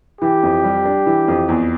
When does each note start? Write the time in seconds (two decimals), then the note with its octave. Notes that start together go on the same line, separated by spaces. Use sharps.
0.21 E3 G4
0.43 F2
0.64 G3
0.85 D4
1.06 E3
1.28 F2
1.49 E2